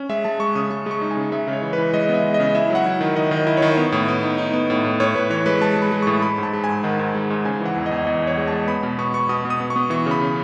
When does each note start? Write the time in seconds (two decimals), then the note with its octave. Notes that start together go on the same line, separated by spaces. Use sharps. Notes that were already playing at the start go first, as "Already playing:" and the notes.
Already playing: C#4
0.09 G#3 E5
0.24 G#3 A5
0.40 G#3 C#6
0.55 C#3 D#6
0.70 G#3 C#6
0.86 G#3 C#6
1.01 D#4
1.11 G#5
1.17 C#3
1.32 G#3 E5
1.48 C#3
1.53 C#5
1.62 E3
1.73 B4
1.78 E3
1.94 G#3 D#5
2.09 B3
2.14 E5
2.24 G#3
2.34 D#5
2.40 C#3
2.54 E4 E5
2.70 F#3
2.75 F#5
2.86 E4
3.01 D#3
3.16 D#3 D#5
3.31 D#3
3.36 D#5
3.47 E4
3.57 D#3 C#5
3.71 D#5
3.77 B3 C#5
3.92 A2
4.08 B3
4.23 D#4
4.38 D#4
4.53 B3
4.70 A2
4.85 A2
5.00 A2 C#5
5.15 A2 B4
5.30 E3 C#5
5.46 G#3 B4
5.61 G#3 A5
5.77 G#3
5.82 B5
5.92 G#3
6.02 A2 C#6
6.22 G#3 B5
6.38 G#2
6.43 A5
6.53 G#3
6.64 G#2 G#5
6.83 D#3 F#5
6.99 G#2
7.15 G#3
7.30 G#2
7.45 C#3 G#5
7.60 E3
7.65 F#5
7.76 E2
7.86 D#5
7.91 E2
8.07 E2 D#5
8.22 E2
8.27 C#5
8.37 G#3
8.47 A5
8.52 G#3
8.68 B3 B5
8.83 B2 B5
8.99 B3 C#6
9.14 B3 C#6
9.29 B2 D#6
9.45 B2
9.50 D#6
9.60 B3
9.70 C#6
9.76 B3
9.90 E3 C#6
10.06 C#3
10.11 B5
10.21 C#3